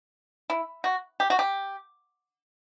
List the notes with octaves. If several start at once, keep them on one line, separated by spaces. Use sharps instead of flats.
E4
F#4
G4
F#4
G4